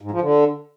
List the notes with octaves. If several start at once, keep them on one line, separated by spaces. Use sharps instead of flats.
G#2
F3
D3